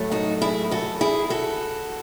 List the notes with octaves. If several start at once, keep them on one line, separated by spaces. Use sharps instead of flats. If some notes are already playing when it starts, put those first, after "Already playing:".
Already playing: A2 F#3 A3
D#4 F#4
E4 G#4
F#4 A4
E4 G#4
F#4 A4